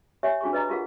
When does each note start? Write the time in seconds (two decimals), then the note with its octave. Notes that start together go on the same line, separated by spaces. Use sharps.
0.23 G4 C#5 E5 G#5
0.41 D4 F#4 G#4 C#6
0.53 B4 D#5 A#5 B5
0.69 F4 G4 G#4 A#4 F5 F#5